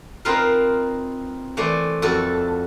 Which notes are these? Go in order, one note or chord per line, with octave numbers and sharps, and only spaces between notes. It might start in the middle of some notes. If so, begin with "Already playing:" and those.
C4 D#4 F4 A#4 B4 F5
E3 A3 C5 D5
F2 F#4 A4